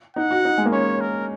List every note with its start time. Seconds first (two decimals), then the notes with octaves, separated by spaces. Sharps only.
0.16 D#4 F#5
0.31 F#4
0.45 D#4
0.58 G#3
0.65 A#3
0.72 C#4 C#5
1.01 A#4